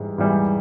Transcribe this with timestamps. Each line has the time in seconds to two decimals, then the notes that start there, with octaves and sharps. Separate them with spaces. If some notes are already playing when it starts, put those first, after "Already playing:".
Already playing: G#2 E3 G3
0.18 G#2 E3 G3